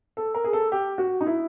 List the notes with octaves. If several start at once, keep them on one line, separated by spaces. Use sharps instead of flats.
A4
A#4
G#4
A4
G4
F#4
D#4
E4